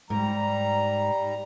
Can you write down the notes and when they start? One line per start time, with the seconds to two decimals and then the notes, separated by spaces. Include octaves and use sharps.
0.10 G#2 G3 A#5